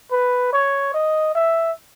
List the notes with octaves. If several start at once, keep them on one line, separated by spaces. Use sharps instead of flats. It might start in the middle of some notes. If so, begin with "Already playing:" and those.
B4
C#5
D#5
E5